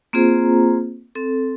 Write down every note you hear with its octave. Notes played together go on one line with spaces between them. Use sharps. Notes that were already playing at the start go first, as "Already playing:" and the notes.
A#3 C4 F4 G#4 C5 A#5
C4 A4